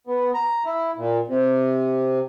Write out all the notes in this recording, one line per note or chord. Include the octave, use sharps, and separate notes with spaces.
B3
A#5
E4
A#2
C3